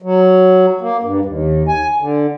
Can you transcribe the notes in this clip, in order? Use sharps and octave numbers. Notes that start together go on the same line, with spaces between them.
F#3
A#3
G2
D#2
G#5
D3